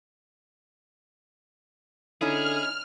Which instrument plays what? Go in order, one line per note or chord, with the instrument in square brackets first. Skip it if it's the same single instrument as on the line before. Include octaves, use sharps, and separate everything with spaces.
[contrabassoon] D3 [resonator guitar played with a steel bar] C#4 D#4 E4 [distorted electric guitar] G#4 [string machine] F6